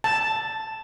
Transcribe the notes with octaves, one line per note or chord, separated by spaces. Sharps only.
A5